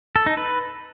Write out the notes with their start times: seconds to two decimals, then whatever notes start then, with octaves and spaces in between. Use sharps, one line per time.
0.16 A4
0.26 D#4
0.37 B4